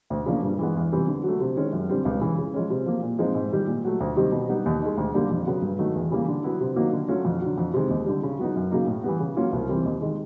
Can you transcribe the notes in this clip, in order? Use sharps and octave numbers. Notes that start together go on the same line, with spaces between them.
D2
C#3 F3 A#3 D4
G2
E3 G#3 B3
E2
C3 E3 G3 C4
D3
F#3 A3
C3
D#3 G#3 C#4
F#2
D3 G3 C4
C#2
C#3 E3
C#3
F3 G#3 C#4
C3
F3 A#3
A#2
F3 G#3 C4 D#4
G#2
D#3 G3
A#2
F#3 A3
D2
C3 D#3 G3
B2
G3 B3 D#4
D#2
D#3 G#3
D2
D3 G3 A#3 D4
F2
C#3 F#3 B3
G2
D#3 F#3 A3
E2
C#3 E3 G3 A#3
D3
F#3 B3 E4
C3
D#3 F#3 A#3
D3
F#3 A3 C#4 F4
F2
D3 F#3
F2
C3 D#3 G#3
D#2
D3 G3
C#3
F#3 B3 D#4
F#2
C#3 F#3 A#3 D#4
A2
E3 G3 B3
C#3
F#3 A#3 C#4 F4
C2
C3 E3 G3 C4
D#2
D#3 G#3